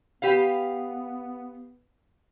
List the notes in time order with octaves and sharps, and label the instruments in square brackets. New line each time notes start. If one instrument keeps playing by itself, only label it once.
[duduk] B3 [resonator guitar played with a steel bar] G4 B4 F5